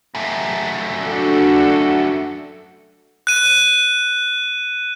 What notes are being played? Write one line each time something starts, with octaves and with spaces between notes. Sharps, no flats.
F#2 A3
D4 F#4 A4
F#6 D#7